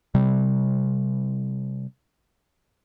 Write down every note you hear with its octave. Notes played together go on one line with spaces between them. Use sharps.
C3 G3